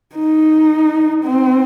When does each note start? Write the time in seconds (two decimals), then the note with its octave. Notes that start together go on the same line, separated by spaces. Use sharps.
0.16 D#4
1.24 C4